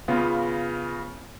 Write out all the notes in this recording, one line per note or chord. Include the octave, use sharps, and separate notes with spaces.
C#3 B3 F4